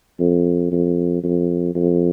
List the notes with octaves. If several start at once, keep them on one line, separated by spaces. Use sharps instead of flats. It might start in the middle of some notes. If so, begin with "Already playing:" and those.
F2
F2
F2
F2